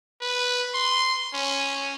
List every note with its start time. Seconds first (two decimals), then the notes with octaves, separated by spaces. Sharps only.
0.21 B4
0.74 C6
1.34 C#4